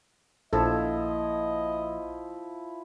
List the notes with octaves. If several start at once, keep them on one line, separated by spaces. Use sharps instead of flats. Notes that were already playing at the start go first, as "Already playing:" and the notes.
A#1 F3 E4 A4 D#5